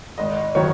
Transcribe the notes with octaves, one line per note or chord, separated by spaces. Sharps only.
G#1 D#5
D#3 F#3 C#5